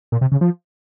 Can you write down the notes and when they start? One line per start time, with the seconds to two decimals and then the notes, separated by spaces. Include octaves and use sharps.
0.12 A#2
0.21 C3
0.32 C#3
0.41 F3